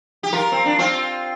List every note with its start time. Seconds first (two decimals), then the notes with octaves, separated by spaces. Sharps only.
0.23 G4
0.33 F4 A#4
0.52 C4
0.66 D4
0.78 C4 F4